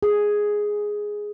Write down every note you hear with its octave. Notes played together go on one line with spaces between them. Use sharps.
G#4